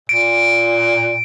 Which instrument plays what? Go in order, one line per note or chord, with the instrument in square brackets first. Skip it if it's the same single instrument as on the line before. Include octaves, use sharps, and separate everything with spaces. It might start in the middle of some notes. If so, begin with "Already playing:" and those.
[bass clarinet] A#2 [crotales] D7